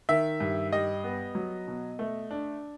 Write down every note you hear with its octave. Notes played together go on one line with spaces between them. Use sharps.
D#3 E5
G2
G3 D#5
B3
F#3
B2
A3
D4